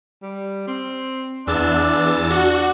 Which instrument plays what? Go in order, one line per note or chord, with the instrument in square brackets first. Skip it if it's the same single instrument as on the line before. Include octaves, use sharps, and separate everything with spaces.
[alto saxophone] G3
C4
[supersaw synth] E2 E6 A6 [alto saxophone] D4
[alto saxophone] D4 [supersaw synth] F#4